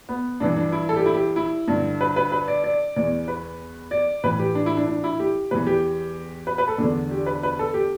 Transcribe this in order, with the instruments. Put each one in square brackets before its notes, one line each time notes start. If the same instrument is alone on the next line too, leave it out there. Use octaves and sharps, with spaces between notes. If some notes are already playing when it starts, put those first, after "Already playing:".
[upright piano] B3
G2 E3 D4
D4
E4
A4
G4
E4
G4
E4
G2 D3
B4
B4
B4
D5
D5
E2 E3 D5
B4
D5
A2 E3 B4
G4
D4
E4
D4
D4
E4
G4
E2 E3 B4
G4
B4
B4
A4
E2 D3 D4
G4
B4
B4
A4
G4